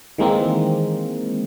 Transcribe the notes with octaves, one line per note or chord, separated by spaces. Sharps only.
D#3 E3 G#3 A#3 C4